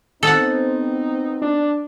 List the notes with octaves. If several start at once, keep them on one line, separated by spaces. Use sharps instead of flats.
B3 C4 D#4 A4 F#5
D4